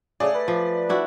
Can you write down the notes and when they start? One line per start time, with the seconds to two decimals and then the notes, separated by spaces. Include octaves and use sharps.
0.20 C#3 A3 G#4 D5
0.35 B4
0.48 F3
0.89 D4 E4 F#4